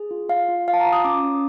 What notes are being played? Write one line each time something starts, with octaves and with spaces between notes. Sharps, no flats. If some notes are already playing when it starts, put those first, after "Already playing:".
Already playing: G#4
F4
F4 F5
F4
F4 F5
A5
A#5
F4
D#6
C#4 D6
C#4